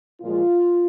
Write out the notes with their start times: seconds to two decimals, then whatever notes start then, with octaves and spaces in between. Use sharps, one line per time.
0.21 A#2 F3 G#3 F4